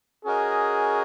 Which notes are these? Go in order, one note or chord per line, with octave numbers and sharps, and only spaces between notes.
C#4 F#4 G#4 A#4 D#5